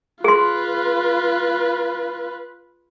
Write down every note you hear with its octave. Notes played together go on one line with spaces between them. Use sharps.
F4 G#4 B4 C6